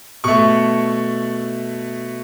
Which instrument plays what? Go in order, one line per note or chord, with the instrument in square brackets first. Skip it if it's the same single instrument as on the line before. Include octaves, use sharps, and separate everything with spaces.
[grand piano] B2 A3 C#6